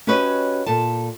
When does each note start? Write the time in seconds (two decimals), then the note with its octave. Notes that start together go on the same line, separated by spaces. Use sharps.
0.07 C#4 F#4 G4 B4 C#5 D#5
0.66 A#2 A4 A5